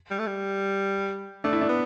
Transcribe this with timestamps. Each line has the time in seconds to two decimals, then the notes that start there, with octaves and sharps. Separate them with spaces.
0.11 G3
0.19 A3
0.27 G3
1.44 A3 D4
1.53 E4
1.61 D4
1.69 B3